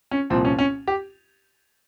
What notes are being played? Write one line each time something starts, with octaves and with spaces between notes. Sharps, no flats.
C#4
C2 A#2 F3 C4
C#4
C#4
G4